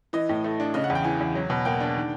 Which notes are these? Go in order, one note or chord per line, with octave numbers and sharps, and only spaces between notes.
E3 D#5
A2
A3
D4
C#3 D#5
F#5
E2
G5
E3 G#5
E2
F#3
B2
A#3 G5
D4
D#3